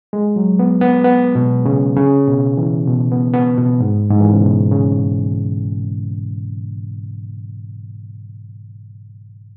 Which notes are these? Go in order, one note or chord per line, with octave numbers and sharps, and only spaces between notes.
G#3
F#3
B3
B3
B3
B2
C#3
C#3
B2
E3
B2
B3
B3
B2
G#2
G#2
E3
C#3
B2
C#3